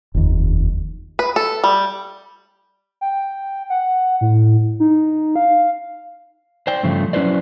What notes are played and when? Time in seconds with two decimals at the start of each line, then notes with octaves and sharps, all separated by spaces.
0.14 F1 D#2
1.19 B4
1.36 A4
1.64 G3
3.01 G5
3.70 F#5
4.21 A2
4.80 D#4
5.36 F5
6.67 C5 D5 G5
6.83 G2 C#3 F3 A3
7.13 F#3 C#4 E4 B4 C5 D5